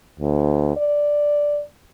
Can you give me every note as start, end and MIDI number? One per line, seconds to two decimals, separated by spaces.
0.20 0.76 38
0.77 1.60 74